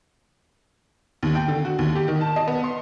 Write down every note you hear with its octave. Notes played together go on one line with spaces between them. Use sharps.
D#2
G5
D3
F#4
D#2
G4
D#3
A5
D#5
B3
C6